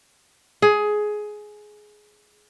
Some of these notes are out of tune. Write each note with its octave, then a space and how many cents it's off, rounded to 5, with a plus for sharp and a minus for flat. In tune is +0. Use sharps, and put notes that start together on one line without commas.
G#4 +15